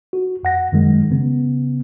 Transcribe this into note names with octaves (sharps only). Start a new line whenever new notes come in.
F#4
F2 F#5 A#6
F#2 D#3 F#3 G#3
C#3 B3